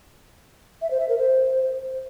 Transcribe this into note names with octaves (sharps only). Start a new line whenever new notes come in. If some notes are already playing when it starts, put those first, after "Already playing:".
E5
C5
E5
A#4
C5